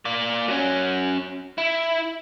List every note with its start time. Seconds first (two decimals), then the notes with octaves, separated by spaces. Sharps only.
0.05 A#3 D5
0.48 F#3 C#4
1.58 E4